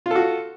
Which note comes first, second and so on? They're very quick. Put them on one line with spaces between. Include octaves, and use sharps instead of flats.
F4 A4 F#4